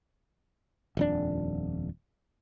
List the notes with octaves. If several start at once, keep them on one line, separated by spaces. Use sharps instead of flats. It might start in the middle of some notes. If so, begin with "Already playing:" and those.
D#1 F2 D4